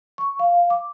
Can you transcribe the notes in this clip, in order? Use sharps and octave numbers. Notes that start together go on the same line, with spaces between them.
C#6
F5
D6